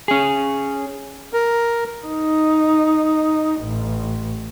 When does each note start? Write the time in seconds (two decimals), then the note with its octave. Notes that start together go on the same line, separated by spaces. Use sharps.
0.08 C#4 G#4
1.33 A#4
2.06 D#4
3.62 A1